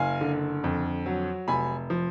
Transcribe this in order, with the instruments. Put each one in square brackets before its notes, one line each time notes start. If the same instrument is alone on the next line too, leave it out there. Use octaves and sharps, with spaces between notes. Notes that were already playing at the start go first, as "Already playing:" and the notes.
Already playing: [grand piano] F#1 F5 G#5
D3
F2
F#3
F1 G#5 B5
F3